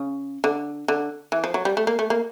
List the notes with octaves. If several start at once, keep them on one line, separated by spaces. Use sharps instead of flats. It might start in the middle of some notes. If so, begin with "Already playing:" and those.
Already playing: C#3
D3
D3
E3
F3
F#3
G3
A3
A#3
A3
A#3